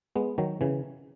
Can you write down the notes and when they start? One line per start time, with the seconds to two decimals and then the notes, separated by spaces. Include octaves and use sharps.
0.16 G#3 B3
0.38 D#3 F#3
0.61 C#3 E3